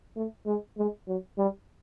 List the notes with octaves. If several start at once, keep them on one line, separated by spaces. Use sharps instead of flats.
A3
G#3
G#3
F#3
G3